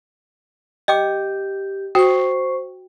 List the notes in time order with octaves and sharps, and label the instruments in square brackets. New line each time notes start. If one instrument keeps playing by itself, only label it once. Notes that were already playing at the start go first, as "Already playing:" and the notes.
[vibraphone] G4 [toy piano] D#5 G5 D6
[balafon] F#4 [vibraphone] C5 C#6 [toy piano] G5